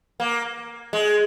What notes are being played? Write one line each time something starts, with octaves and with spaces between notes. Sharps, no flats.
A#3
G#3